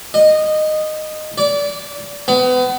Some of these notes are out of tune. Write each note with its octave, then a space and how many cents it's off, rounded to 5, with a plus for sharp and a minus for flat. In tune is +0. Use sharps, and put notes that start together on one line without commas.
D#5 -15
D5 -25
B3 +30